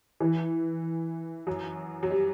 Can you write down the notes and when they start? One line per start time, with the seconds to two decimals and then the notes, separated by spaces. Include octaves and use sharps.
0.21 E3
1.47 F#2 F#3
2.03 F#3
2.10 G3